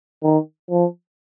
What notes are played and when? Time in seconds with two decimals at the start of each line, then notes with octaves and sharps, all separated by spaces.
0.24 D#3
0.71 F3